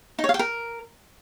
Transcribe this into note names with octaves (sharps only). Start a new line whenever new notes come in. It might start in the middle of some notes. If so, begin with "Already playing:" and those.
D#4
C#5
F5
G5
A#4